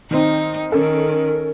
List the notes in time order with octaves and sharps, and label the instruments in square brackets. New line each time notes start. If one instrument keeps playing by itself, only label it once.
[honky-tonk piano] D#3 C4 [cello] D#4
[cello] D#3 [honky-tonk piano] C#4 A4 [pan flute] A#4